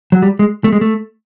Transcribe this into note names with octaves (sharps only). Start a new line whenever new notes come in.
F#3
G3
G#3
A3
G#3
A3